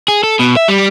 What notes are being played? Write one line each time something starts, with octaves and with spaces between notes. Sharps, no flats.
G#4
A4
B2
E5
G3